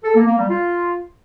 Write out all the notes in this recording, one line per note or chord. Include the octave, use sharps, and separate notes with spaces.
A4
A#3
A#3
G3
F4